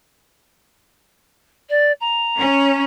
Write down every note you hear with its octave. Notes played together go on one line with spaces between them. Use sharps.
D5
A#5
C#4